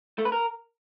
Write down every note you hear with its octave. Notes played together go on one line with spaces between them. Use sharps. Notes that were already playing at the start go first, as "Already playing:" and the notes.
A3
B4
A#4